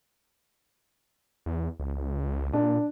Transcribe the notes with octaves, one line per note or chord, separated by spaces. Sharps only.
E2
C#2
A#2 D4